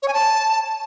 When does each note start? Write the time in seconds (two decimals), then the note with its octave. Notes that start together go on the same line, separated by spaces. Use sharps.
0.02 C#5
0.08 G#5
0.14 A5